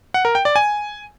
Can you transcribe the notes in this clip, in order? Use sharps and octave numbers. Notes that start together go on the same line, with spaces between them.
F#5
A#4
G5
D5
G#5